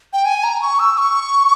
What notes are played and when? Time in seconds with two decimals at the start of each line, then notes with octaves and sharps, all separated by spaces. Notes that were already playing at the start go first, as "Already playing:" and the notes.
0.13 G5
0.25 G#5
0.44 A#5
0.62 C#6
0.79 E6
0.97 C#6